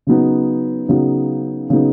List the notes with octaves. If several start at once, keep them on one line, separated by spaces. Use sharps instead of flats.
C#3 F#3 B3 D#4
C#3 F#3 B3 D#4
C#3 F#3 B3 D#4